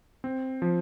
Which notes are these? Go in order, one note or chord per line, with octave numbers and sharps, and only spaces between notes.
C4
F3